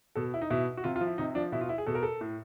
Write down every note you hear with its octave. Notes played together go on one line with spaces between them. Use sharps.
B2 A4
E4
D#4
B2 E4
F#4
C3 F4
F4
F3
E4
C3 D#4
F3 D4
B2 E4
F4
E4
G#4
B2 A4
A#4
A4
A2